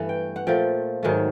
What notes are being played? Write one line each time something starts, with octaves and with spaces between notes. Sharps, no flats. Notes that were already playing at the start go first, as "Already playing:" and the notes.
Already playing: G2 E3 A3 B3
G5
F#5
A#2 F3 A3 G5
G#2 D#3 F#3 A3